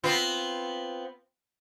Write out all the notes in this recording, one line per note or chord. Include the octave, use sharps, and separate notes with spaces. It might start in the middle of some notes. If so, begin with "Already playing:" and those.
B3 C4 F4